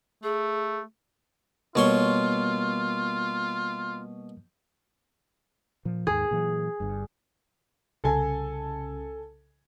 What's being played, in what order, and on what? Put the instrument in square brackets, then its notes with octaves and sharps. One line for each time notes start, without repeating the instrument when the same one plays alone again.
[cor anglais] A3 [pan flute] G#4
[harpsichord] B2 C#5 C6 [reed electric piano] G3 A#3 A#4 [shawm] F4
[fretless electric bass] A#2 F3
[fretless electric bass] D#2 G#2 [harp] G#4
[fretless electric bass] A#2 E3 F#3
G1 G2
[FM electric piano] C2 C#3 [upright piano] A4 G#5